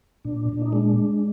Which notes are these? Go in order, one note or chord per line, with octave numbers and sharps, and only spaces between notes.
A#2 D4
A#2
D#4
G#3 D4
G#3